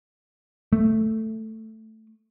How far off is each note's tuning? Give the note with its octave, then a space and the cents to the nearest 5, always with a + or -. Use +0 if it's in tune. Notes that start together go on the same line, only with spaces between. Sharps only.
A3 +5